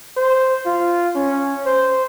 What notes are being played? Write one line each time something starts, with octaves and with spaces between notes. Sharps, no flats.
C5
F4
C#4
C5